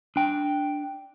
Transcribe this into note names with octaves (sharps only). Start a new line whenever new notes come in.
D4 G5